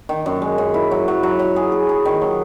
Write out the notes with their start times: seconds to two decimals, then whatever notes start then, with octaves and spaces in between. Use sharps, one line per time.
0.09 D#3
0.26 F#2
0.42 G#3
0.58 F#2
0.74 E4
0.91 F#3
1.08 F#3
1.23 F#3
1.39 F#3
1.56 G#4
1.72 G#4
1.89 G#4
2.05 D#3
2.22 F#3